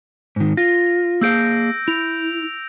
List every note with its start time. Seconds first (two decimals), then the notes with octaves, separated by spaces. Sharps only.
0.36 G#2 D#3
0.57 F4 A#6
1.21 A#3 G#4 F5 E6 G6 D7
1.88 E4 F7